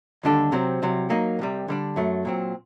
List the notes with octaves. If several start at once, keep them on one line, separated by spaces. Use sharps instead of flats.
D#2 D3 G3 D4 A4
C3 F#3 C4
C2 C3 F#3
F#3 A#3 D#4
C2 C3 G3
D3 G3 D4
F#2 F#3 A3
A#2 F#3 C4